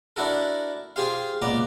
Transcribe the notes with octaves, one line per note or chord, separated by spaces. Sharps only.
D4 E4 F#4 A4 A#4
F4 G4 G#4 C5 F5
C#2 A#2 B3 A#5 D6